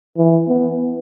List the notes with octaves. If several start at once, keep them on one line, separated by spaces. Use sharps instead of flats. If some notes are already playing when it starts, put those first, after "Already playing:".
E3
B3